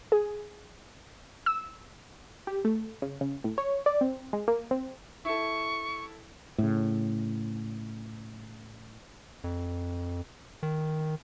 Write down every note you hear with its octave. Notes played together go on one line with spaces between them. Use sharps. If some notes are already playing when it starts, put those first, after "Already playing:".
G#4
E6
G4
A3
C#3
C#3
A2
C#5
D5
C4
G#3
A#3
C4
E4 A4 C#6
A2 C#3
F2
D#3